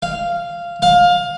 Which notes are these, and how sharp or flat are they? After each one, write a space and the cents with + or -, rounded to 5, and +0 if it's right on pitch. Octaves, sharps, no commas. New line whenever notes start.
F5 -10
F5 +20